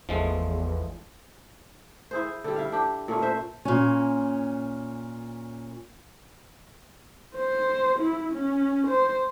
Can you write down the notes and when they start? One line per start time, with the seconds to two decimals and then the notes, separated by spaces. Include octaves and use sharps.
0.09 G#1 E2 F3 G#3 A3
2.11 E4 G#4 C5
2.44 D3 G3
2.56 E4 F5
2.72 D4 G4
3.08 A#2 A3 C#4
3.22 C5 E5
3.65 A#2 C#4
7.36 C5
7.99 E4
8.32 C#4
8.87 C5